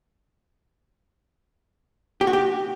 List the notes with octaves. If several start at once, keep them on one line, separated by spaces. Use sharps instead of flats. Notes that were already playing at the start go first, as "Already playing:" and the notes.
G4
F#4
G4